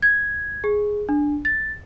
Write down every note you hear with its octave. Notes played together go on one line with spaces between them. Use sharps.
G#6
G#4
D4
A6